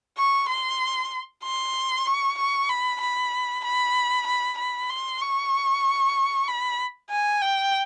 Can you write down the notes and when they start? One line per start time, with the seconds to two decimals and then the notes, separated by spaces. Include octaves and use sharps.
0.17 C#6
0.49 C6
1.44 C6
2.07 C#6
2.38 C#6
2.69 B5
3.01 B5
3.65 B5
4.27 B5
4.58 B5
4.89 C6
5.21 C#6
6.48 B5
7.10 G#5
7.42 G5